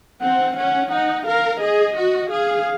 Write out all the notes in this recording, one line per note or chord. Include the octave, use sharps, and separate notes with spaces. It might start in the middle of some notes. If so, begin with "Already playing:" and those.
C4 F#5
C#4 F#5
D#4 F#5
A#4 F5
G#4 D#5
F#4
G#4 F5